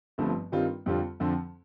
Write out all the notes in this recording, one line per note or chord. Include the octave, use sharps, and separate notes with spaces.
G1 G2 F3 A3 C4
G2 D#3 G3 C4 F4
F2 D3 G3 C4 F4
F2 D3 F3 C4